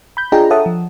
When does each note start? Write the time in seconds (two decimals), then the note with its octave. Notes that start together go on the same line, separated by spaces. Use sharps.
0.17 B5 G6
0.32 D4 F4 G#4 D#5 G5 A#5
0.50 A4 C#5 E5 F#5 A5 D#6
0.66 F3